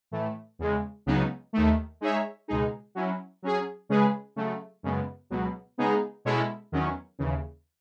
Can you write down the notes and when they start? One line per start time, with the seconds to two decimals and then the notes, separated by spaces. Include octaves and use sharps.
0.11 A2 E3 A3
0.59 E2 C#3 G#3
1.06 C#2 C#3 F#3 B3 D#4
1.53 D#2 D#3 A3
2.01 G#3 D#4 G#4 C#5 E5
2.48 C#2 B2 G#3 D#4 G#4
2.95 F#3 C#4 E4
3.42 F#3 C#4 G#4
3.89 C#3 G#3 C#4 G#4 B4
4.36 C#3 F#3 A3
4.83 F#2 C#3 G#3 B3
5.30 C#2 B2 F#3 B3
5.78 C#3 G#3 B3 D#4 G#4
6.25 B2 G#3 C#4 E4 A4
6.72 E2 D#3 F#3 C#4
7.19 D#2 C#3 E3